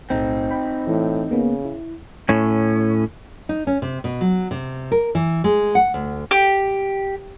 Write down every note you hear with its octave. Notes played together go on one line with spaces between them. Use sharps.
B1 A2 A3 C4 D#4
C5 G5 B5
A2 E3
C#3 A#3 B3
E4
A2 C#4
D#4
C#4
C3
B2
F#3
C3
A#4
E3
G#3
F#5
D2
G4